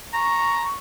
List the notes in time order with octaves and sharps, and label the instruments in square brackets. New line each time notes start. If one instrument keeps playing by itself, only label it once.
[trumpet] A#5 [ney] C#6